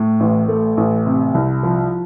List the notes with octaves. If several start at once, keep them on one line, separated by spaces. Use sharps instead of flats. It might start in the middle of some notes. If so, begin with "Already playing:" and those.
Already playing: A2
A1
A3
A1
C3
C2
F3